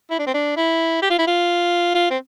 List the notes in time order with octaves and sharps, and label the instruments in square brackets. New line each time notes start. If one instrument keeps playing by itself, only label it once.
[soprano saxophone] E4
D4
C4
D4
E4
G4
F4
E4
F4
F4
C4